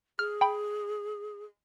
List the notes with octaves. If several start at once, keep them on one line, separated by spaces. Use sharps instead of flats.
G#4 F6
G5 B5